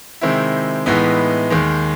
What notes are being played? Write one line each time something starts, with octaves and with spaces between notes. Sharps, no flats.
C3 D#3 G#3 C4 E4
A2 E3 G#3 B3 D#4
D#2 D#3 G#3